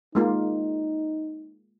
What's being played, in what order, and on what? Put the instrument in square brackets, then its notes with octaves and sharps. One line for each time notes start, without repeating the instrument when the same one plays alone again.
[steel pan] G#3 A#3 F4 [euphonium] D#4